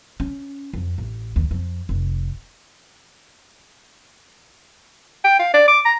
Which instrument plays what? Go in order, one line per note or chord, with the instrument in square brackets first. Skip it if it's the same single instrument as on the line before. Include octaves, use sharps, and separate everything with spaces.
[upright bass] C#4
F2
A1
D#2
F2
F1
[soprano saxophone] G5
F5
D5
D6
A#5